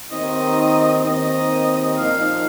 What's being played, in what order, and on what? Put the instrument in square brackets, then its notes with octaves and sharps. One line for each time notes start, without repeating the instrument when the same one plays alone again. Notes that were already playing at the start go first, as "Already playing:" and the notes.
[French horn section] D#2 D#3 C4 D#4 [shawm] D#5
[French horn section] D#2 D#3 C4 [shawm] D#5
[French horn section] A#2 F3 A#3 D#4 [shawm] F5